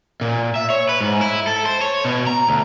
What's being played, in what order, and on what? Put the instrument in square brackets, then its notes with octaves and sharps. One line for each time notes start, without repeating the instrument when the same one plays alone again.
[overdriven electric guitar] A#2
E5
C#5
B4
G#2
E4
A4
C5
C#5
B2
A#5
D2